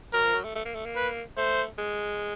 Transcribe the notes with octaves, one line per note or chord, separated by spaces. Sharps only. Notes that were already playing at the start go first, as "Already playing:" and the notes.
F#3 A#4
F3
F#3
A3
A3
A#3
A3
A#3
B4
A3 C5
G#3